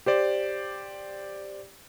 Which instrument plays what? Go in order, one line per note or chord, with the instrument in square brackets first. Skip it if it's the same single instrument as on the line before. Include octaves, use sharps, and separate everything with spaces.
[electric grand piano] G4 C5 D5